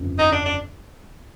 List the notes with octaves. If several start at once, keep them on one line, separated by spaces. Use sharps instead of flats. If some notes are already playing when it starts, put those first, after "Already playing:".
Already playing: G1 F2 C#3 F3
D#4
D4
D4